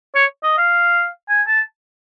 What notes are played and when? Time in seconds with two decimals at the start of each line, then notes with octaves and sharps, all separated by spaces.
0.15 C#5
0.43 D#5
0.58 F5
1.29 G#5
1.47 A5